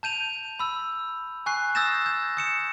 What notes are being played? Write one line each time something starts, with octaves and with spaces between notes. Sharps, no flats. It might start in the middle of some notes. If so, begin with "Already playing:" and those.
A5 G6 D#7 F7
B5 E6
G#5 C#6 F#6 C7
D#6 E6 G6 A6 A#6 E7
G6
D#6 C#7 E7